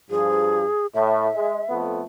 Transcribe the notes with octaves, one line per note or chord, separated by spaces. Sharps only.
G2 F3 G#4
A2 E5
G#3
F2 A3 B3